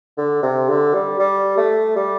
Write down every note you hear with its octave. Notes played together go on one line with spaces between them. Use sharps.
D3
C3
D3
G3
G3
A3
G3